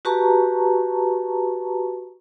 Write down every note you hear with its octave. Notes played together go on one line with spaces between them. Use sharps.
F#4 G4 B4 A5 A#5 C#6